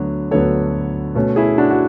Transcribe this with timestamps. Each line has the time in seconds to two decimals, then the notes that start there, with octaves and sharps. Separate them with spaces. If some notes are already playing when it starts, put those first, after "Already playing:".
Already playing: D2 D3 F#3 B3
0.31 D2 D3 F#3 B3 A4 C#5
1.15 B2 A3 C#4
1.36 E4 G#4
1.58 D4 F#4
1.70 F#4